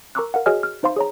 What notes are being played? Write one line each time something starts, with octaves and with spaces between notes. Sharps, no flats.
A#4 A#5 C#6 D6 E6 F#6
A#4 F5 F#5
F#4 G#4 C#5 D#5 G#5 F6
F6
D#4 C5 F5 C6
G#4 C#5 A#5